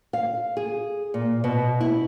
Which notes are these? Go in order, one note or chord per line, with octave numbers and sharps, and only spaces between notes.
F5
G#4
A#2
B2
E4